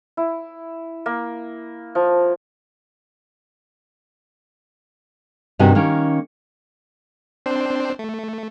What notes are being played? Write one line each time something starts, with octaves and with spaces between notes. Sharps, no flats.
E4
A#3
F3
G2 C3 D#3 D#4 F#4 G#5
D#3 A#3 C#4
C4 D4 C5
A3